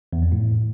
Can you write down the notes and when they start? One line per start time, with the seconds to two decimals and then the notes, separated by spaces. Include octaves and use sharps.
0.13 E2
0.22 F2
0.32 A2